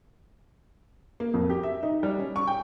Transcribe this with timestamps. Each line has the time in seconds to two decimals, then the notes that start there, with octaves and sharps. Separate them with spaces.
1.20 A#3
1.34 F2
1.50 G4
1.63 E5
1.83 D#4
2.03 G3
2.19 C#4
2.36 C#6
2.47 G5